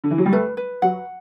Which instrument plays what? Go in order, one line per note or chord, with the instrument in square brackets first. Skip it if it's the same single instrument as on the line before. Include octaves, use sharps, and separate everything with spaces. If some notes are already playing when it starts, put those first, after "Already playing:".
[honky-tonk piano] D3
E3
F#3
G3
[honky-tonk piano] A3 [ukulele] B4
[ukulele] B4
[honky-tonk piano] F#3 [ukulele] F#5